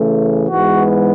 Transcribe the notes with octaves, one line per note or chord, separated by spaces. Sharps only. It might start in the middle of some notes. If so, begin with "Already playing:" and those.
Already playing: C#3 E3 A3
G#2 E3 G#3 B3 F#4